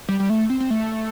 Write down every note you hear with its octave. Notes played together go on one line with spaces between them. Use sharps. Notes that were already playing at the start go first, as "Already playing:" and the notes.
G3
G3
A3
C4
C4
A3